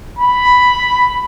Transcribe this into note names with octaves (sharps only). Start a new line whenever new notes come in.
B5